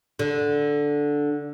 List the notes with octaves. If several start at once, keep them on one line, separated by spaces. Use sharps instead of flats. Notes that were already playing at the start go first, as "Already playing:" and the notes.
D3